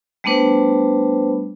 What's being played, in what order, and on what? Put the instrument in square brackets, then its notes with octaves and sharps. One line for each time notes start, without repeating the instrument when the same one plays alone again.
[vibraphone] G3 A3 B3 D4 B4 C5